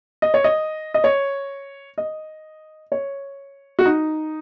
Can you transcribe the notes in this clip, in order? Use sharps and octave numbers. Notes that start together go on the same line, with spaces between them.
D#5
C#5
D#5
D#5
C#5
D#5
C#5
F#4
D#4